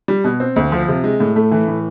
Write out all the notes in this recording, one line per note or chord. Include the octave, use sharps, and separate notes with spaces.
G3
B2
C4
D2
F3
C3
G#3
A2
A3
E3
A2